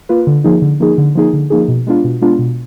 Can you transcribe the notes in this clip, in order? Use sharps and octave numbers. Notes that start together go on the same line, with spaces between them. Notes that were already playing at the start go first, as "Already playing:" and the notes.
A#3 F4 B4
D3
F3 A#3 D#4 G#4
D3
F3 A#3 D#4 G#4
D3
F3 A#3 D#4 G#4
D3
F3 A#3 D#4 G#4
B2
G#3 B3 D4 F4
B2
G#3 B3 D4 F4
B2